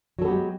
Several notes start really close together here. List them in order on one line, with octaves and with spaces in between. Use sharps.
F#3 A4 B3 G4 G#3